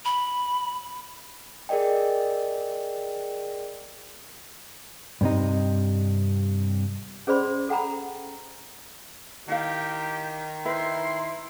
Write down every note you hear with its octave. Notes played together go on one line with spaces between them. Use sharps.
B5
G#4 A#4 D5 D#5 G5
G2 C3 D#4
C#4 G#4 C5 D5 B5 C6
A4 F#5 G5 A#5 B5
D#3 E4 G4 F5
E4 B4 C5 C6